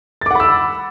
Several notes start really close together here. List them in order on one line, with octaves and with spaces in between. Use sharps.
A6 D6 F#5 B5 E6